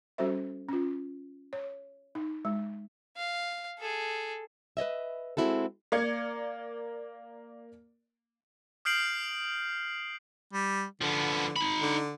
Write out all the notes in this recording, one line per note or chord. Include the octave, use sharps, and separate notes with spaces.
G3 C#4 F#4 A4 C5 E5
C#4 F4
C#5
D#4
G#3
F5
G#4 A4
B4 C#5 D#5 E5
G#3 C4 E4 F#4 A4
A#3 D5 G#6 C#7
D#6 F6 G6 C7 D7 F#7
G3
D3 F3 B3
D#4 B5
D3